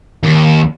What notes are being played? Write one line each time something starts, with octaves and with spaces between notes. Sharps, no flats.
D#2